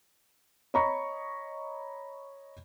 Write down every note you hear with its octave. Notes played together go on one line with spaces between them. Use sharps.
C#5 D#5 A#5 B5 C#6